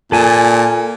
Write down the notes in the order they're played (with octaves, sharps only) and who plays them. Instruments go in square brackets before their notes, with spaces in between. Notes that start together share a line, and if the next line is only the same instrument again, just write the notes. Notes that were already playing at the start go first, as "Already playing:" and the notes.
[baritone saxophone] A#2 [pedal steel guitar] A4 G#5 A5